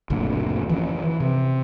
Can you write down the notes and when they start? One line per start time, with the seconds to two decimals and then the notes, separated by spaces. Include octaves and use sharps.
0.10 F#1 D2 A#2 D3
0.69 E3 F3 C#4
1.04 E3
1.20 C3